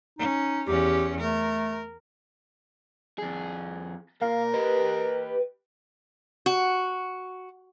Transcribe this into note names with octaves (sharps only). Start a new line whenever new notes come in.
C#4 D#4
E2 C#4 G4
A3 A#4
F2 G#4
A#2 A#4 F5
G4 B4 D#5
F#4